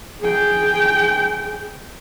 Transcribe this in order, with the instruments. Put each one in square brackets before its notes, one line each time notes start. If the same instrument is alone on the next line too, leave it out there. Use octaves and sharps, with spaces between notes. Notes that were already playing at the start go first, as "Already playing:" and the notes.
[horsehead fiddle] G#4 G5